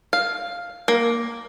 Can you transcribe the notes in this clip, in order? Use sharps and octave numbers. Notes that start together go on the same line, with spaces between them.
F5
A#3